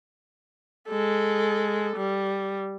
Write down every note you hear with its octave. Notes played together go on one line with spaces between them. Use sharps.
G#3 A4
G3